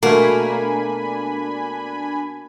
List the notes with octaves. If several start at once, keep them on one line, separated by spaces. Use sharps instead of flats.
B2 A3 A#3 D4 G#5 B5